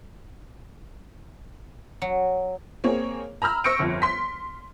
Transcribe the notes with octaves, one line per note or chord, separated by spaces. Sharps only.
F#3
A#3 C4 G#4 C#5
A#5 B5 E6 F6
C5 C#6 E6 A#6 C#7 D7
G1 F2
C6 B6